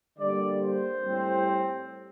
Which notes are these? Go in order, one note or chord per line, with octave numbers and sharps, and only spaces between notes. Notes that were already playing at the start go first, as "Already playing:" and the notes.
D3 G3 A#3 D5
C5
A2 G3 C4